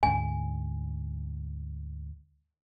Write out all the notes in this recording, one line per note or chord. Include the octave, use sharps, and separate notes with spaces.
D2 G#2 G#5